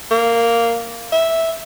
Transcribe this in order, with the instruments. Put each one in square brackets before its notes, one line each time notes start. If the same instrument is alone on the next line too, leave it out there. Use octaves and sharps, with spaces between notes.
[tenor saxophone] A#3
E5